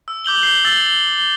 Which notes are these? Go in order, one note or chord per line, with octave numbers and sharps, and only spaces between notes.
E6
D6 G6 F#7 G7
G6 C7 G7
E6 A6 C7 F#7 G7
G7
G7